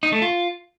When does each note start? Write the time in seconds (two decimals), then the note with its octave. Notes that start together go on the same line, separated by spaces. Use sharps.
0.03 D#4
0.12 A3
0.22 F4